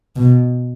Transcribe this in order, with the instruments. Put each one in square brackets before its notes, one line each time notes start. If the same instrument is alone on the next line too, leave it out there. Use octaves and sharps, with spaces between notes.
[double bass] B2